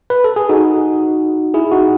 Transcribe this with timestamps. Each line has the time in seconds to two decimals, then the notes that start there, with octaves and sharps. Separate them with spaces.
0.10 B4
0.24 A4
0.36 G#4
0.49 D#4 F#4
1.54 E4 G#4
1.71 D#4 F#4